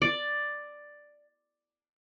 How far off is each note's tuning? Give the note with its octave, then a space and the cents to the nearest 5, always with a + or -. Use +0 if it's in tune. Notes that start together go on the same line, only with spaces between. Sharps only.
D5 +5